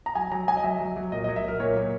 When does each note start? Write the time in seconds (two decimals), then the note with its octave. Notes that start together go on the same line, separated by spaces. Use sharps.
0.06 A#5
0.15 F#3 G#5
0.32 F#3 A#5
0.48 F#3 G#5
0.57 D#5
0.64 F#3 E5
0.80 F#3
0.96 F#3
1.12 A#2 D#5
1.24 D#5
1.29 F#3
1.36 E5
1.44 F#3 A#4
1.60 A#2 C#5
1.76 A#2